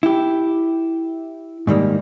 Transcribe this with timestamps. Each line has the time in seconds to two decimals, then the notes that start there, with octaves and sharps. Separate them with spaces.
0.03 E4 G4
1.67 G#2 D#3 G3 A#3